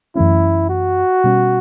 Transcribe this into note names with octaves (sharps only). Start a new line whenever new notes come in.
F#2 E3 A3 C#4 E4
F#4
B2 G3 C#4